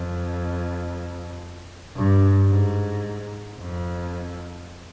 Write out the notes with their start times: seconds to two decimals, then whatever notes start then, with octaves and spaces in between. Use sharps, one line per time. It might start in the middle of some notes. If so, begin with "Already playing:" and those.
Already playing: F2
1.96 G2
2.50 G#2
3.60 F2